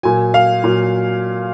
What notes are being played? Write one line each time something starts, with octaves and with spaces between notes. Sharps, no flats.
A#2 F#3 G#5
F5
A#2 F#3